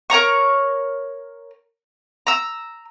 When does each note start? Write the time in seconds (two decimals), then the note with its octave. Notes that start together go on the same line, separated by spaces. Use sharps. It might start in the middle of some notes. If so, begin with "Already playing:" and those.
0.10 A#4 C#5 A#5 C#6
2.27 A#5 E6